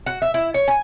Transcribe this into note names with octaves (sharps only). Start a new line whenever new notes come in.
F#4
E5
E4
C#5
G#5